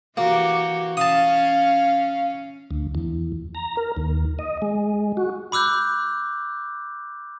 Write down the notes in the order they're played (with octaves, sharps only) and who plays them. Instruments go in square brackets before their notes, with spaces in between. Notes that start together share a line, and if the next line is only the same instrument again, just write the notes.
[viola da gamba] E3 F#4 G4 [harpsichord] A#3
[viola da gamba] C#4 [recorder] F5 [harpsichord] A5 D#6
[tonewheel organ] D2
E2
A#5
A#4
D#2
D#5
G#3
F#4
[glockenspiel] B5 D6 E6 F#6 G6